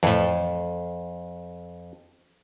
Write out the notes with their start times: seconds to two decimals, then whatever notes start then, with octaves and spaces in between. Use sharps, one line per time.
0.03 F2 A2 E3